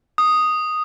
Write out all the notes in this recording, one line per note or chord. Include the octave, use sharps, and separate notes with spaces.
D#6